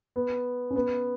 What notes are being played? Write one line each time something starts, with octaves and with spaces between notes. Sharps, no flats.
B3
C#4
B3